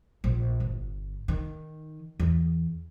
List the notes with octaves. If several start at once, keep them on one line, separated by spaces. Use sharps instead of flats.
A#1
G1
D#3
E2